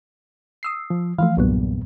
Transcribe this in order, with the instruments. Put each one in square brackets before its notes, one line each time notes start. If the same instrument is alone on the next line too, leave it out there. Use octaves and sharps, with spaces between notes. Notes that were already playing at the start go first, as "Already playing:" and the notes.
[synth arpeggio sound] D#6 E6 C7
[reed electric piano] F3
[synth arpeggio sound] E3 F3 A3 [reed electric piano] F5
[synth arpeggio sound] B1 F#3 B3 [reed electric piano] E2 G2 A#2